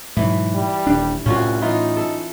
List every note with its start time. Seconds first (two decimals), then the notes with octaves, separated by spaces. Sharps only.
0.17 G#2 B2 E3 F#3
0.55 G3
0.87 D#1 D4
1.26 C2 A2 C#4 F4 F#4
1.61 E3 D#4 F4
1.97 A4